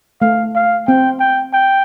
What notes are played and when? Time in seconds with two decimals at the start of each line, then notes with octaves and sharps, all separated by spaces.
0.21 A3 F5
0.55 F5
0.88 C4 G5
1.20 G5
1.53 G5